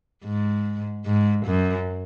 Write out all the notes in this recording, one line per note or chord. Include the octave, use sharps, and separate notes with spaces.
G#2
G#2
F#2